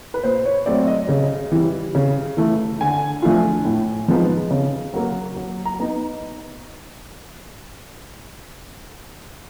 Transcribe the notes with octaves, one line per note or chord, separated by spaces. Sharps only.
B4
A#2 C5
C#5
F#3 A3 C4 D5
D#5
C#3
E3 G3
C#3
E3 A3
D3 G#5
F3 A3 D4 F4
A2
F3 G#3 B3 D#4
C#3
F#3 A#3
F#3
A#5
B3 D#4